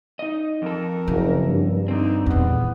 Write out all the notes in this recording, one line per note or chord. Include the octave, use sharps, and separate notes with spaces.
D#4 D#5
F2 A4 A#4
F#1 C#3
G2
D3 C4 D#4
D#1 E2 B3